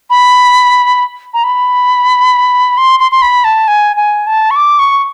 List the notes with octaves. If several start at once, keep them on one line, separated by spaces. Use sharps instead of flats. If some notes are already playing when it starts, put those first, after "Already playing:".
B5
A#5
B5
C6
C6
C6
B5
A5
G#5
G#5
A5
C#6
D6
C#6